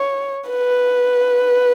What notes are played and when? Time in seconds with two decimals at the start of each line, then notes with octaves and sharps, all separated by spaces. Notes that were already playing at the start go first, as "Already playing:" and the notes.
Already playing: C#5
0.50 B4